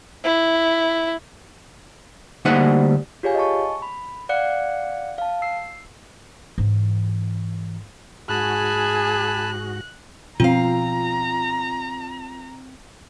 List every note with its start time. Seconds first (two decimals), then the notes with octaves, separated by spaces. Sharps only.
0.24 E4
2.45 D2 G3 A#3 D#4 C5 F#5
3.23 F4 G4 G#4 C#5 F5 G#5
3.35 D#5 G#5 A5 C#6
3.82 B5
4.29 D5 F5 F#5 F#6 C#7
5.18 F5 A5
5.42 E6 C7
6.58 G#2 E3
8.29 G#2 F#4 G#4 G#5 A5 B5 F#6
10.40 B2 F3 C4 F4 F5 A#5